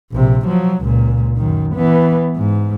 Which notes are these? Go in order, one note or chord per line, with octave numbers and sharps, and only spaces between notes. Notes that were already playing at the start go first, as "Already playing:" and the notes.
A#1 C3
F3 F#3
C#2 A#2
F#2 D#3
E3 B3
G#2